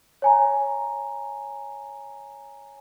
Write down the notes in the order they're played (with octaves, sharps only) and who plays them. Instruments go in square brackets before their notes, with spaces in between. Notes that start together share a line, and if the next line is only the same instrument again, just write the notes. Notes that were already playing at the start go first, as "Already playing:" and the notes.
[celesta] C#5 G#5 A#5